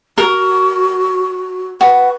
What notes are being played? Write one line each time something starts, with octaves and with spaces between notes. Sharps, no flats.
F#4 A#4
F#4 B4